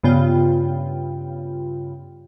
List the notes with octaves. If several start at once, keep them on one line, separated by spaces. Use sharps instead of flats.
G2 C#3 B3 F4 G5